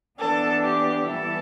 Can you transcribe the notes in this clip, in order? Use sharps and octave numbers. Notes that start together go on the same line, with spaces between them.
E3 B3 D4 A4
G4
E3 G3 B3 E4 A4